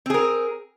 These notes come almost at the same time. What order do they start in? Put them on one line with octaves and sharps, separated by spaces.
C4 G#4 A#4